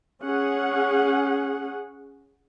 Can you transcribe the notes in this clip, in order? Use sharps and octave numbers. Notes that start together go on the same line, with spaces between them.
C#4 G#4 F#5